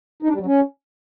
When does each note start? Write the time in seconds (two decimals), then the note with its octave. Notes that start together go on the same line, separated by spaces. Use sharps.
0.23 D#4
0.28 D4
0.34 G3
0.40 F#3
0.46 C#4